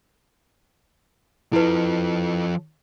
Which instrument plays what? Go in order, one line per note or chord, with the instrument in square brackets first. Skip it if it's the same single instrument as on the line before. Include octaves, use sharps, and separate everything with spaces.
[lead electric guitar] F3 A4 [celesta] E4 B4